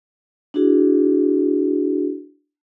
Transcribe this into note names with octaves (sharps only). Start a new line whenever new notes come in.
D4 E4 F#4 G#4